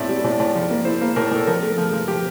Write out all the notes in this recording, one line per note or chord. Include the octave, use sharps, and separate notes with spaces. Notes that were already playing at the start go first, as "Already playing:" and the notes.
Already playing: A2 C4 D5 E5
G3
A2
A2
F3
A#3
E4 C5
A#3
A2 A#4
A2 A4
F3 A#4
A3
F3
F3
F3 G4